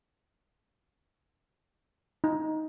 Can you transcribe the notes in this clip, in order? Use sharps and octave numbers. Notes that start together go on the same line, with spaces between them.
D#4